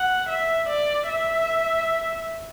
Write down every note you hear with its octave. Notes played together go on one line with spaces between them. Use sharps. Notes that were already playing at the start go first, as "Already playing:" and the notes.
Already playing: F#5
E5
D5
E5